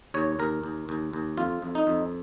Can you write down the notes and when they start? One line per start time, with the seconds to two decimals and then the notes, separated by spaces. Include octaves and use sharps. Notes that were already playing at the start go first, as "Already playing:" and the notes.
0.14 D#2 C#5
0.39 D#2 A#4
0.63 D#2
0.89 D#2
1.13 D#2
1.37 F2 F4
1.62 F2
1.75 D#4
1.87 F2